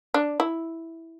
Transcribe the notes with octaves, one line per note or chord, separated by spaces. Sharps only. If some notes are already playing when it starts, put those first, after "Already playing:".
D4
E4